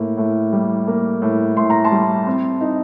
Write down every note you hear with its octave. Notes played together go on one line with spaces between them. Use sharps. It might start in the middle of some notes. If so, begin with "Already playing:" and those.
Already playing: A2 A#3
A2
G3
A#3
A2
A2 C6
A#5
A5 C6
G3
C4
D#4